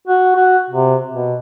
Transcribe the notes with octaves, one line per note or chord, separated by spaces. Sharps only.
F#4
F#4
C3
B2